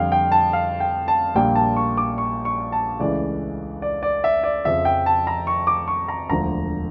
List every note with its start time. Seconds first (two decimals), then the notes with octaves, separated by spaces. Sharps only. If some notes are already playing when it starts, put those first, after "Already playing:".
Already playing: F2 D3 G3 F5 G5
0.12 G5
0.32 A5
0.53 F5
0.80 G5
1.08 A5
1.35 A#1 A#2 G3 A#3 G5
1.55 A5
1.77 C#6
1.97 D6
2.18 C#6
2.45 C#6
2.72 A5
2.99 C#2 C#3 E3 A3 D5
3.82 D5
4.03 D5
4.24 E5
4.44 D5
4.65 F2 C#3 F3 E5
4.85 G5
5.06 A5
5.27 A#5
5.47 C#6
5.67 D6
5.88 C#6
6.08 A#5
6.30 E1 D2 D3 F3 A#5